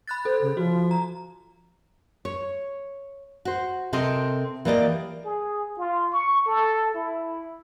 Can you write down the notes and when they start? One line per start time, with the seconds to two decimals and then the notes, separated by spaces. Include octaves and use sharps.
0.07 B5 F#6 A6
0.25 A4 C5
0.42 C#3
0.57 F3 F#4
0.91 A#5
2.25 C#5
3.45 F#4 C5
3.93 C3 C4 A4 A#4 D#5
4.65 E3 A#3 G4 D5 D#5
5.25 G#4
5.78 F4
6.13 C#6
6.46 A4
6.95 E4